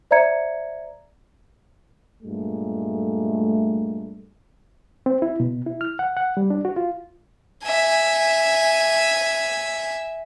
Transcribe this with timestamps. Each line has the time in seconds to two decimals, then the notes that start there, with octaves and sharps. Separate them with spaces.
0.11 C5 D5 E5 A#5 G#6 C#7
2.23 G2 A#2 G#3 A3
5.06 C4
5.22 E4
5.40 B2
5.66 E4
5.81 F6
5.99 F#5
6.17 F#5
6.37 G3
6.50 D4
6.65 F#4
6.76 F4
7.64 E5 G#5